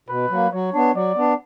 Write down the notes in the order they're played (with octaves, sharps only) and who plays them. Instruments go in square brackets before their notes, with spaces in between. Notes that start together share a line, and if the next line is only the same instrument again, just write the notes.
[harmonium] B2 [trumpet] B4
[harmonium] F#3 A#3
[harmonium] F#3 [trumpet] C#5
[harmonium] B3 D4
[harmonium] F#3 [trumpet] D5
[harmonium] B3 D4